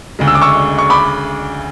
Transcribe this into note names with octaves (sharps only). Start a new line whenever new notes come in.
D2 C#3 G#3
E6
D6
C#6 E6
C#6
B5 D6